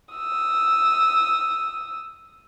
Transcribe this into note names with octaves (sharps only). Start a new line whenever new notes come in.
D#6 E6